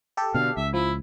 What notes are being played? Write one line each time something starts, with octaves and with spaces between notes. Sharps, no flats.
G4 A4
B2 D3 F5
C#2 E5
F3 E4